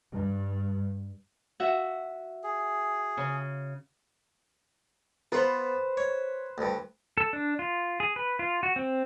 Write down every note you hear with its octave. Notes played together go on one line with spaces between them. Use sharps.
G2
F#4 E5 F#5
G#4
C#3
B3 F4 B4 C5 F#5
C#5
D2 G2
A4
D4
F4
G#4
B4
F4
F#4
C4